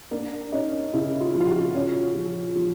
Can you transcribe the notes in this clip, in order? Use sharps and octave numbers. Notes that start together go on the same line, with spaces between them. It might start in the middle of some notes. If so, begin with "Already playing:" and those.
A#3 D4
C#4 D#4
C#3 E4
F4
F3
F4
F#4
C#4
F3
F3